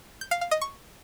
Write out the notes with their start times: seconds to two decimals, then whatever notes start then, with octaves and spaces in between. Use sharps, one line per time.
0.21 G6
0.31 F5
0.41 F5
0.51 D#5
0.61 C#6